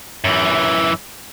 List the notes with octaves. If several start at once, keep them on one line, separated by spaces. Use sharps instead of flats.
F#2 E3